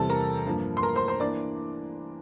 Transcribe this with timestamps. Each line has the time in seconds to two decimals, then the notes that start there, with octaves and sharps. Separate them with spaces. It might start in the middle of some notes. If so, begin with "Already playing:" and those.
Already playing: E2 C3 G3 C4 A4 A5
0.09 A#4 A#5
0.46 G2 F3 A#3
0.77 C6
0.83 A#4 A#5
0.96 C5 C6
1.08 C5 C6
1.20 E3 A#3 D4 D5 D6